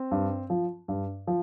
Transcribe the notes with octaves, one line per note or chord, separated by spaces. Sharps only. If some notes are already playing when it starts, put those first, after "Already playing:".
Already playing: C4
G2
F3
G2
F3